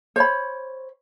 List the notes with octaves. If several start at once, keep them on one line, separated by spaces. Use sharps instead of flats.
C5 C#5 B5